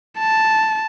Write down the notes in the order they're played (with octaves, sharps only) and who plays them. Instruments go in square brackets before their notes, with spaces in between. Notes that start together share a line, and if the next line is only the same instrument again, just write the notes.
[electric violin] A5